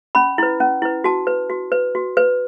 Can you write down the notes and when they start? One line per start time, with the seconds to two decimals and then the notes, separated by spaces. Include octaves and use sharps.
0.15 C#4 B5
0.38 E4 B4
0.60 C#4
0.82 E4 B4
1.04 F#4 A5
1.27 B4
1.50 F#4
1.72 B4
1.95 F#4
2.17 B4